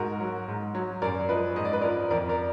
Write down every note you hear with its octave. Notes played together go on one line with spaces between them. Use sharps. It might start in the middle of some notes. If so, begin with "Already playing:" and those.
Already playing: G#2 F#4 A#4
F#3
G#2
F#3
F#2 A#4 D5
F3 B4 D#5
G#2 D#5
D5
B4
F3 A#4 D5
F2 A#4 D5
A#4 D5